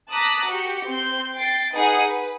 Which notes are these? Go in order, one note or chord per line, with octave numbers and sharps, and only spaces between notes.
A5 A#5 D6 D#6 F#6 B6
F#4 G4 C#7
C4 C6 G6
G5 A6 C7 D7
D#4 G#4 B4 F#5 D#6
B4